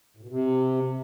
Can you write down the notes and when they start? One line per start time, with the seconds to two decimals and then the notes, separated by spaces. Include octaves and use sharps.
0.17 A2
0.23 B2
0.29 C3